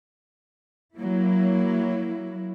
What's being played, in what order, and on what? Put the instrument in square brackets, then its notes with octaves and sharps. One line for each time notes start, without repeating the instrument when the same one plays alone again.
[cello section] F#3 A#3 E4